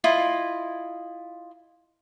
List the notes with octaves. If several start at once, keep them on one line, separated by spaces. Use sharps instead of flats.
E4 F4 D#5